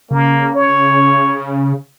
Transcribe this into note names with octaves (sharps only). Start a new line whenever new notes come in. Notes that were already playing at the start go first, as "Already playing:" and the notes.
C#3 A#3
C#5